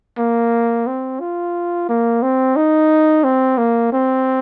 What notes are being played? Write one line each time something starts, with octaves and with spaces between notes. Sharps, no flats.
A#3
C4
F4
A#3
C4
D#4
C4
A#3
C4